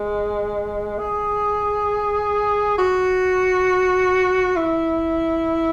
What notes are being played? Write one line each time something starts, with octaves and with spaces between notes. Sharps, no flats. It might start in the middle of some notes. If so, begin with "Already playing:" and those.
Already playing: G#3
G#4
F#4
E4